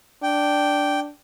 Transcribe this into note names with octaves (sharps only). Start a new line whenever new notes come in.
D4 G5